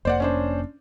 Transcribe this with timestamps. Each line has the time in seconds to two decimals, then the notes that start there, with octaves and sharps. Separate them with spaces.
0.05 F1 F2 A#3 C5 D5 F#5
0.20 C#4 D4 C5